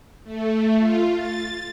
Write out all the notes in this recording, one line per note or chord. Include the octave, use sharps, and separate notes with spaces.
A3
F4
A6